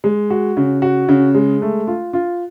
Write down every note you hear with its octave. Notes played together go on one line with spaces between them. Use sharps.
G#3
F#4
C#3
F#4
C#3
G#3
A3
F4
F4